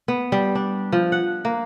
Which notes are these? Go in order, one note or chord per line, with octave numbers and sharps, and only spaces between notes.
B3
G3
D4
F3
F#5
A#3